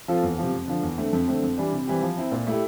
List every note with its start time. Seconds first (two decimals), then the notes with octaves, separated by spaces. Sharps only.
0.08 F3 C4 F4 A4
0.23 E2
0.38 C3 F3
0.53 F2
0.68 D3 F3
0.83 E2
0.98 D3 A3 C4
1.13 F2
1.28 D3 A3 C4
1.43 F2
1.58 E3 G3 D4
1.72 C3
1.87 E3 G3 C4 G4
2.02 F3
2.17 C4 E4
2.32 A#2
2.47 A3 E4 G4